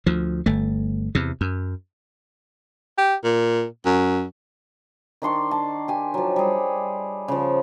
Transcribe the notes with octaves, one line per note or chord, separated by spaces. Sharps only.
D2 F3
G1 A3
E2 C3
F#2
G4
A#2
F#2
D#3 D4 C6 C#6
A5
G4 G#5
F3 F#3
G3 G#4
C#3 F3